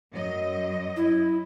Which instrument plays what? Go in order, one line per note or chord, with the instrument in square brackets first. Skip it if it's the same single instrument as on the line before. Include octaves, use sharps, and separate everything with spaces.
[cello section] F#2 F#3 D#5
[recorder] E4